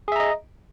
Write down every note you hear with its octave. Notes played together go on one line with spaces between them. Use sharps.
G#4 D#5 E5 A#5